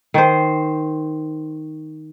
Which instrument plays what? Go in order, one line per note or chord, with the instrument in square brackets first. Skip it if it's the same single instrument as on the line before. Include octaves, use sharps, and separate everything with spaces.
[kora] D#3 C5